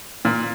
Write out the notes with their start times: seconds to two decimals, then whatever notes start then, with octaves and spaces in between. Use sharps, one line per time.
0.25 A#2